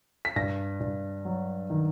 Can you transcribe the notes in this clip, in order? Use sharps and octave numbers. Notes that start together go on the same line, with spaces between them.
B6
G2 A#6
G2
F#3
D#3